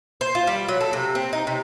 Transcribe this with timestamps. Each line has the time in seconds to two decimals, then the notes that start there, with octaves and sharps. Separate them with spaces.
0.21 C5
0.35 F4
0.47 G3
0.68 F#3
0.81 A4
0.93 C3
1.15 C4
1.33 D#4
1.47 C3